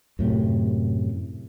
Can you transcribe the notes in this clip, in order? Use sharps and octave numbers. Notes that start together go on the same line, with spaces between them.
F#2 A2 C3